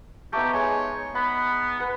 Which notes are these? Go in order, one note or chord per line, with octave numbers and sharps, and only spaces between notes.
A3 B3 D#4 G4
G#3 C#5
B3 B5
B4 F#5